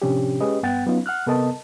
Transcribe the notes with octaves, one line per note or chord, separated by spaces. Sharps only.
A2 C3 F3 C#4 D4 G4
G#3 C#4 G4 G#4 B4 D#5
G2 B3 F#5 G5 A6
F#3 B3 C#4 D#4 F4
F#5 F6 F#6
C3 B3 A4 A#4 D#5 A5